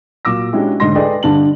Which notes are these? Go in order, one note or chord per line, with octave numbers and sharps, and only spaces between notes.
A#2 F#3 D6 E6 A#6
G#3 C#4 D4 E4 F#4 G4
G#2 D3 D#5 C6 A#6
G#4 A4 B4 D5 D#5 G5
G2 D3 A5 F#7